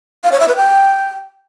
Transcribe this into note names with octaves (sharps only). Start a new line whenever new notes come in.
F5
C#5
E5
B4
G5